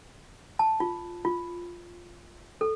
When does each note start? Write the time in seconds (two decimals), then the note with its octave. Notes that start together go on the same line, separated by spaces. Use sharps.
0.59 A5
0.80 F4
1.25 F4
2.61 A4